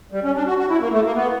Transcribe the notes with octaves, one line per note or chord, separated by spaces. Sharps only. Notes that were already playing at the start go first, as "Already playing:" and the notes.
G3
C#4
D4
F#4
F#4
E4
A#3
A3
A#3
B3